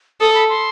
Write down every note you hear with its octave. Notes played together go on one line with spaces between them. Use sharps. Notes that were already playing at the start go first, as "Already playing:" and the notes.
A4 D#6
B5
C6